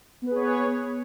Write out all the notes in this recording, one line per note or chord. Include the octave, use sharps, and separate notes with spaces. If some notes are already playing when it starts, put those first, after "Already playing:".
B3 G#4 B4 C#5